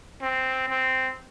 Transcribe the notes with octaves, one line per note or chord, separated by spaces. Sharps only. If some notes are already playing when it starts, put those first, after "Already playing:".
C4
C4